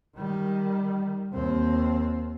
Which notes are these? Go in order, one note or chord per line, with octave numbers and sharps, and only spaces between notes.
D#3 G3
D#2 C4